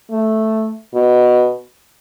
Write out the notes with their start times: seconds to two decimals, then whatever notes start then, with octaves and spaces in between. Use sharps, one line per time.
0.11 A3
0.94 B2